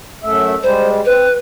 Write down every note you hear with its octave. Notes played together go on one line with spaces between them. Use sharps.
F#2 A3 E5
G3 G#3 C5
C4 B4